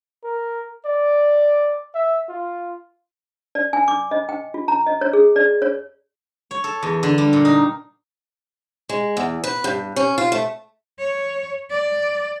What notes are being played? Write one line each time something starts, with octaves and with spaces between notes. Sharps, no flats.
A#4
D5
E5
F4
D5
G#5
D6
D#5
G5
F4
A#5
D#5
C#5
G#4
D5
C#5
C#5
A4
E2
D3
G3
A#2
D#4
G#3
E2
B4
G2
C#4
F4
A3
C#5
D5